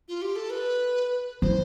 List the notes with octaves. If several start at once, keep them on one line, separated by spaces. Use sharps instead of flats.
F4
G4
A4
B4
E3 C5